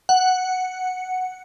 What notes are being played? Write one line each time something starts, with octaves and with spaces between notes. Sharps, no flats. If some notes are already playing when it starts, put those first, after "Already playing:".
F#5